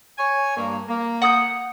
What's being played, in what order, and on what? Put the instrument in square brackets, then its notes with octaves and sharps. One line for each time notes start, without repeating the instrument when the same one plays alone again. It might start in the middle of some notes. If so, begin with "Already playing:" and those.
[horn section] C#5 G#5
G2 A#3
A#3
[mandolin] F#5 D#6 G6